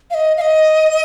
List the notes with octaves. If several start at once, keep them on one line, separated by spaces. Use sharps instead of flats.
F5
D#5
F5
D#5